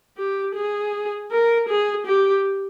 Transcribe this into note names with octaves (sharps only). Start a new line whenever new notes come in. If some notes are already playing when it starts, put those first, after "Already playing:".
G4
G#4
A#4
G#4
G4